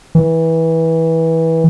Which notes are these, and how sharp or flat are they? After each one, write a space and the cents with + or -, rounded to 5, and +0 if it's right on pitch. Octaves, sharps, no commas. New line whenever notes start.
E3 -20